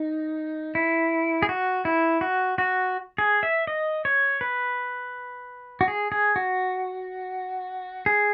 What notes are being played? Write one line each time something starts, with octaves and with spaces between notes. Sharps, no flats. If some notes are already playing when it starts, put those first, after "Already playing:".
Already playing: D#4
E4
G#4
F#4
E4
F#4
F#4
G#4
E5
D#5
C#5
B4
F#4
G#4
G#4
F#4
G#4